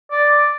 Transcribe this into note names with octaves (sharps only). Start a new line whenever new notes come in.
D5